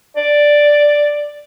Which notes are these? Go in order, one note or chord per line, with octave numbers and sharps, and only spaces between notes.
D5